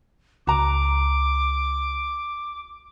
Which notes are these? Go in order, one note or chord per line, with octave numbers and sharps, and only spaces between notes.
C#2 F#4 A#5 D6